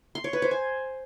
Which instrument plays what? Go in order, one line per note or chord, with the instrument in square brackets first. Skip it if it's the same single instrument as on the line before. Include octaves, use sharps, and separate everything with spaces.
[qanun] C6
C#5
B4
C5
G#5